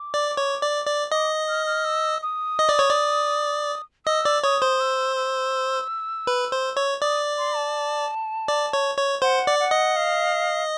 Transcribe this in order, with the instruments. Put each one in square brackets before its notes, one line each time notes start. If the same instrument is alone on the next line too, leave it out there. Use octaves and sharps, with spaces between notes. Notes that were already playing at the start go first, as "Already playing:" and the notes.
Already playing: [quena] D6
[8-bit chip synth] D5
C#5
D5
D5
[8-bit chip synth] D#5 [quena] D6
[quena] F6
F6
E6
D#6
[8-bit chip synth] D#5
D5
C#5
D5
[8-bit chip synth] D#5 [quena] E6
[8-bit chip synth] D5
[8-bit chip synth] C#5 [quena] D#6
[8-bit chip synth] C5
[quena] E6
E6
[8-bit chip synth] B4
C5
C#5
[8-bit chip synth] D5 [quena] D#6
[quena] C6
A5
[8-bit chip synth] D5
C#5
C#5
[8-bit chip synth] C5 [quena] F#5
[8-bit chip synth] D5
[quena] F#5
[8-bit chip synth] D#5
[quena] F5